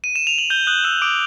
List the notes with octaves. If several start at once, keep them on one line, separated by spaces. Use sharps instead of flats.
D#7
E7
F7
F#7
G6 G7
D#6 F#6 F#7
E6 G6 E7
D6 D#6 D7